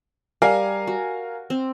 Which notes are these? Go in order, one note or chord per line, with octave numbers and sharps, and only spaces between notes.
G3 A#4 F5 G#5
F#4
C4